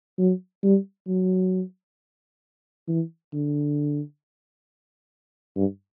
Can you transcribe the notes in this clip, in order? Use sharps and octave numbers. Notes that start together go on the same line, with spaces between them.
F#3
G3
F#3
E3
D3
G2